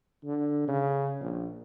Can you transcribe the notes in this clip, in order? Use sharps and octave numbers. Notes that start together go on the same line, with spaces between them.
D3
C#3
A#1